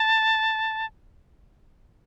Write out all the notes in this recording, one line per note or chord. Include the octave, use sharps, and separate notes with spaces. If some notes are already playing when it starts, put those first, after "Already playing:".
Already playing: A5